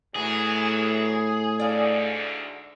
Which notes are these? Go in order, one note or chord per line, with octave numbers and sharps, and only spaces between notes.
E2 A2 E3 F#3 G#4
D2 G#2 D3 D5 F5